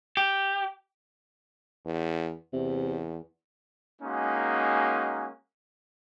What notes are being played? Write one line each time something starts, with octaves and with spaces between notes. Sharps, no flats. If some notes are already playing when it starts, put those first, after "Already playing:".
G4
E2
E2 C3
G#3 A#3 C#4 D#4 F#4